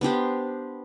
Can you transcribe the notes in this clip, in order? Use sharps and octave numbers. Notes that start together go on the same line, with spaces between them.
B3 D4 G4 C5